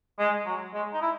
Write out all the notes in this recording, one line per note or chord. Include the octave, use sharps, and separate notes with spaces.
G#3
F#3
G#3
D#4
E4